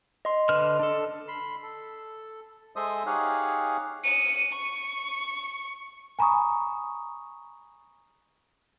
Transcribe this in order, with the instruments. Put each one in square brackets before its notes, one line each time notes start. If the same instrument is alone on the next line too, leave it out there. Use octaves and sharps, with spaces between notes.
[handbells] D#5 C6
[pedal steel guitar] D3 B4 F6
D4 A4
[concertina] B5 C6
A4
G#3 A4 C5 D#5 E5 D#6
D#4 G4 G#4 C#5 F5 F#5
[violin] C#7 D#7
C#6
[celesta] G#5 A#5 B5 C#6 D#6